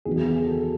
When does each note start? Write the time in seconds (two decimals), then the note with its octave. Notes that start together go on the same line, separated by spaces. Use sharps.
0.06 E2 D#3 F#3 B3 G#4
0.16 G#4
0.26 F#4
0.36 G#4
0.47 A4